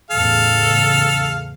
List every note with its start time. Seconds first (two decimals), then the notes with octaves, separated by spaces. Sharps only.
0.11 E2 A2 C#3 A4 F5